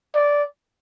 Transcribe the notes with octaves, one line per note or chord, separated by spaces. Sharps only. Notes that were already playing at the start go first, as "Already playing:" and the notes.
D5